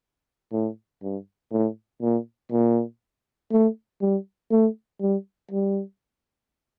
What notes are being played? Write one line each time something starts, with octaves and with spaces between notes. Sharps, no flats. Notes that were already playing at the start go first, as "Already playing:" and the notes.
A2
G2
A2
A#2
A#2
A3
G3
A3
G3
G3